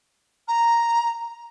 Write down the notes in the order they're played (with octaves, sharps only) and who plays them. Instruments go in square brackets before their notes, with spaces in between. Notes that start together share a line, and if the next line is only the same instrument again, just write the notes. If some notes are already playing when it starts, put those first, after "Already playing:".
[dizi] A#5